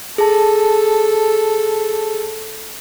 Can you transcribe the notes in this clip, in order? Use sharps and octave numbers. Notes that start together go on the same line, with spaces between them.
G#4 A4 A5